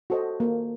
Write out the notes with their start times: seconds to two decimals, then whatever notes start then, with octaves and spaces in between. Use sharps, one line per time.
0.10 F#4 A4 C5 D#5
0.40 A#3